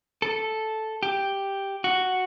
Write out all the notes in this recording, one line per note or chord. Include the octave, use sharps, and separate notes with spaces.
A4
G4
F#4